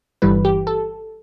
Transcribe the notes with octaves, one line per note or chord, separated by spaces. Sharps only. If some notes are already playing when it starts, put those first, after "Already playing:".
G1 G2 E3 G3 B4
G4
A4